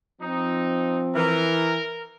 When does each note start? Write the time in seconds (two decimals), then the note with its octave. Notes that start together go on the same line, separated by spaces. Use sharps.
0.21 F3 C4 D#4
1.15 E3 A#4